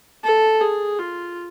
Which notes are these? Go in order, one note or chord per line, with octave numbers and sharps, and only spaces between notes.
A4
G#4
F4